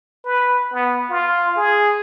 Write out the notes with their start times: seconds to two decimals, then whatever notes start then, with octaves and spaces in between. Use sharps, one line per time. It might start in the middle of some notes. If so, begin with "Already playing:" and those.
0.25 B4
0.72 B3
1.10 F4
1.56 G#4